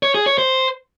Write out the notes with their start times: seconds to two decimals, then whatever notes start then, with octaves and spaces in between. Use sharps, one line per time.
0.03 C#5
0.15 G#4
0.26 C#5
0.38 C5